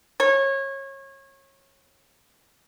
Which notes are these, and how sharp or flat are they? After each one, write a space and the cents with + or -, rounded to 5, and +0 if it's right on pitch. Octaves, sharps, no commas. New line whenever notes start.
C#5 -25